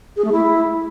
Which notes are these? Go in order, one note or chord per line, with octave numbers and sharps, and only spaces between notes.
G#4
A3
E4